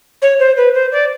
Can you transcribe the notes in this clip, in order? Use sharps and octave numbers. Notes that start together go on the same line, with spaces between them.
C#5
C5
B4
C5
D5